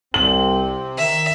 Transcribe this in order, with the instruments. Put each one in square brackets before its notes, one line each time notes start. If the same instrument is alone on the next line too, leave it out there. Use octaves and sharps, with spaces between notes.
[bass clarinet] C2 [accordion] C3 C4 [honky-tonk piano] F#7
[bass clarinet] D#3 [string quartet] E5